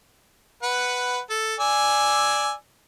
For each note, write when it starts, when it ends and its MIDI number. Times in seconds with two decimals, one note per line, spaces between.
0.63 1.19 71
0.63 1.19 78
1.30 1.54 69
1.60 2.52 74
1.60 2.52 80
1.60 2.52 88